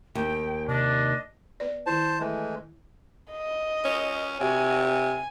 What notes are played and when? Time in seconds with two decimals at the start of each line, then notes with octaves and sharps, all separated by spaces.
0.15 D#2 G5
0.68 C3 D4 D#5
1.60 B3 B4 D5
1.86 D#3 E4 C5 A5
2.20 E3 G#3 A3
3.32 D#5
3.85 C#4
4.41 C3 F#4 G#5
4.87 G#5